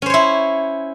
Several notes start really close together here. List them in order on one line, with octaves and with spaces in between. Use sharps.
C#4 C5 C#5 E4